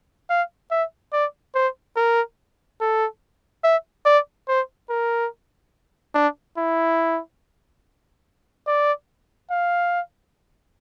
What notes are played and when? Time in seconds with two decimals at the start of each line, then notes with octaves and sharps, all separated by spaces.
0.30 F5
0.71 E5
1.13 D5
1.55 C5
1.96 A#4
2.81 A4
3.64 E5
4.06 D5
4.48 C5
4.90 A#4
6.15 D4
6.57 E4
8.67 D5
9.51 F5